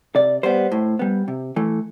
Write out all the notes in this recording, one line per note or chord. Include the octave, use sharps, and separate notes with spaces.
C3 D5
G3 B3 C5
A2
G3 B3
C3
E3 A3